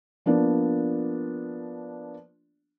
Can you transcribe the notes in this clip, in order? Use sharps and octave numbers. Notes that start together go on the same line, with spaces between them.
F3 A#3 B3 D4 D5